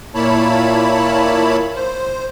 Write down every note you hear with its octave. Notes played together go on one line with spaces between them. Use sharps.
A#2 A#3 E4 C#5 A5 B5
C5